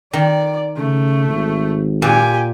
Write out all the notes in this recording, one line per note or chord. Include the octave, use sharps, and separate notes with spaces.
D#3 D5
C#3 A3
G#1
A#2 G4 G#5